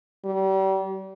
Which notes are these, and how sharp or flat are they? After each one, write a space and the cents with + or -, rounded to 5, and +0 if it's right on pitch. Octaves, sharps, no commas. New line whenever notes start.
G3 -35